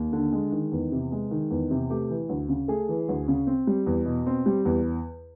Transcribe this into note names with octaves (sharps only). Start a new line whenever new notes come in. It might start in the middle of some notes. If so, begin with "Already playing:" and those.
Already playing: D#2
D3
G#3
D#3
E2
C3
G#3
D#3
E2
C3
A3 G4
E3
D2
C#3
A3 G#4
E3
D2
C#3
C4
G3
E2
B2
C4
G3
E2